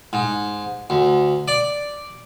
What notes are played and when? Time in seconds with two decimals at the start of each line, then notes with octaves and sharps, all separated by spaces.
0.13 G#2
0.90 D2
1.48 D5